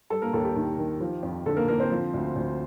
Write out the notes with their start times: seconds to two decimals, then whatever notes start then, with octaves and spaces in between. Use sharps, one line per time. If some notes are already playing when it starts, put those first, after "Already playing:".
0.10 G3 A4 A5
0.22 A#3 A#4
0.33 D#2 A4
0.45 G4
0.56 D#3
0.78 D#3
1.00 F3
1.23 F2
1.46 D3 A4
1.56 A#3 A#4
1.68 D3 A#3 A#4
1.80 C4 C5
1.90 F3
2.14 D2
2.36 D2